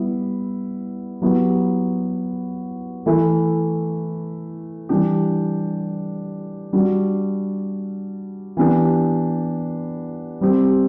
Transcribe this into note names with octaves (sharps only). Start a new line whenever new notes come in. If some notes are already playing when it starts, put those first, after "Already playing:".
Already playing: G3 B3 E4
F#3 B3 E4 G4
E3 A3 E4
E3 G3 D4 G4
G3 D4 F#4
E3 B3 D4 G4
G3 C4 G4